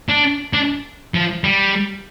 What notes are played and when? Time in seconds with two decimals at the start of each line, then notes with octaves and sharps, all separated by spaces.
0.09 D4
0.53 D4
1.14 F3
1.44 G3